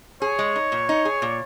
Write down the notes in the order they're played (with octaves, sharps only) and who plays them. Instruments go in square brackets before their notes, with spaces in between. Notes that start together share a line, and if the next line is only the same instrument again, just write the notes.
[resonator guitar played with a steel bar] G#4 [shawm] C#5
[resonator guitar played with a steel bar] G#3
D#4
A#2
D#4
G#4
A#2